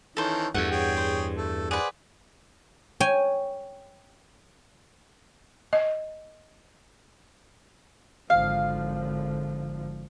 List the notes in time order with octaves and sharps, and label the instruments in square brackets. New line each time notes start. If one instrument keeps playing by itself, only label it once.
[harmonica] D#3 E3 C#4 [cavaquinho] A4 C5
[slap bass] E2 G2 [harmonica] A3 [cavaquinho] F#5
[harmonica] G#4 C#5 G5
[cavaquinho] C5
[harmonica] A3 A4
[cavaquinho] G#4 B4 [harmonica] C5 D5 F#5
[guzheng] C#5 G5 G#5
[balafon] D#5
[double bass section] G#1 D3 F3 [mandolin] F5